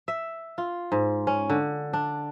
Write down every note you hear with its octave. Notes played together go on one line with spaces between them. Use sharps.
E5
F4
G#2
C#4
D3
D4